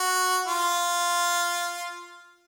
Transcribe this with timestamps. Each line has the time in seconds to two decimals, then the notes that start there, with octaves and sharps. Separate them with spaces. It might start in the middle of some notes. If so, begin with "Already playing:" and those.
Already playing: F#4
0.46 F4